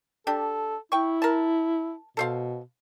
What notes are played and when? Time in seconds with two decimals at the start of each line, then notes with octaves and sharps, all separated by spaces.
0.27 D4 G4 A4
0.92 E4 G5 C#6
1.22 A#4 A5
2.17 B2 A4 C5 F5